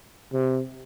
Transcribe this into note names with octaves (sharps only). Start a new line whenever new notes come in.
C3